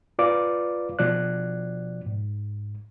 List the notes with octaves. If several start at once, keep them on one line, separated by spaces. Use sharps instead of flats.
F4 B4 D5 F5 D6
B2 F3 D5 F#6
G#2